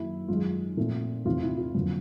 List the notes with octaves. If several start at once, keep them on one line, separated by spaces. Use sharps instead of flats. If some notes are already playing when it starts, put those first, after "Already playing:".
Already playing: F#2 D#3 F#3 A#3 E4
F#2 D#3 G#3 F4
A#2 F3 A3 C4
E2 C3 F3 A3 C4 F4
E4
F4
F2 D3 F#3 A#3